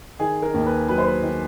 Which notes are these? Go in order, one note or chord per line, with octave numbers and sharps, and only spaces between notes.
D#3 G#4
A#4
D#2
B4
F#3 B4
C5
B4
D#3